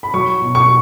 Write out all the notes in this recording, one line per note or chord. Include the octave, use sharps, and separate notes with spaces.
B5
F#3 C#6
B2
C#6